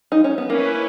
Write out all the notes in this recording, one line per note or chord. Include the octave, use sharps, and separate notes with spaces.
D#4
C#4
B3
A#3 C#4 E4 B4